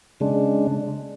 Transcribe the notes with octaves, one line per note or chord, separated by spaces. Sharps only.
C#3 G#3 D4